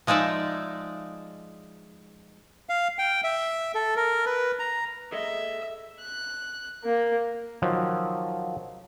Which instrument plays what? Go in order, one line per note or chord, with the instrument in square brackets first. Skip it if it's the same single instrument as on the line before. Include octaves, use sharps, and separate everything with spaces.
[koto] F3 G#3 D#4 D5 E5
[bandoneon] F5
G5
E5
A4
A#4
B4
A#5
[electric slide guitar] G#4 A4 D#5 [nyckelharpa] E5
[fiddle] F#6
A#3
[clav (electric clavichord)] D#3 F3 F#3